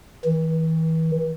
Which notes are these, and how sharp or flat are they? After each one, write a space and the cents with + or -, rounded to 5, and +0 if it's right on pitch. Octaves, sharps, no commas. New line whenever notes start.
E3 -35